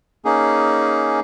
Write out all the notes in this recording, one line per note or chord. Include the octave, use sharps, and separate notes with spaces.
A#3 C#4 D#4 G#4